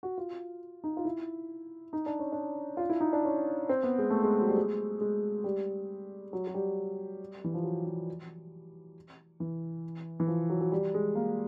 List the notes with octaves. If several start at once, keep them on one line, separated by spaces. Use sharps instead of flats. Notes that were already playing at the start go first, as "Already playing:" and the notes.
F#4
F4
D#4
F4
E4
D#4
D4
C#4
D4
F4
E4
D#4
D4
C#4
C4
B3
G#3
A3
G#3
F#3
G3
G#3
G#3
G3
F#3
F#3
G3
E3
F3
F#3
F3
E3
E3
F3
F#3
F#3
G3
G#3
A#3